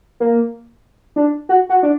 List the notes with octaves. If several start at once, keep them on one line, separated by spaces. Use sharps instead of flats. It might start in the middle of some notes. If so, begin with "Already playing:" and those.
A#3
D4
F#4
F#4
D4